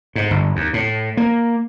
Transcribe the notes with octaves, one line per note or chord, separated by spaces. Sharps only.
G#2
G1
D#2
A2
A#3